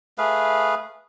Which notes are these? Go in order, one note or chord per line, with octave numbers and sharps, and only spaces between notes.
A3 G#4 B4 F5